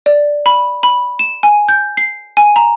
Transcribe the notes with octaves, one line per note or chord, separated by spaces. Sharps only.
D5
B5
B5
E7
G#5
G6
C7
G#5
A#5